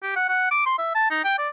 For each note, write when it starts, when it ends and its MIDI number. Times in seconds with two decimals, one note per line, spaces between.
0.03 0.16 67
0.16 0.26 78
0.29 0.47 78
0.51 0.62 86
0.66 0.76 84
0.78 0.95 76
0.95 1.10 81
1.11 1.22 63
1.24 1.34 79
1.38 1.49 74